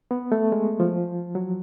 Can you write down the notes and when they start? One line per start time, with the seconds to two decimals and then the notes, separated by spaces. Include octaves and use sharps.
0.11 B3
0.32 A3
0.52 G#3
0.80 F3
1.35 F#3